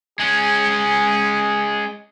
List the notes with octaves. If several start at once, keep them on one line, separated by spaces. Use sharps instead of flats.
G#3 C#4 G#4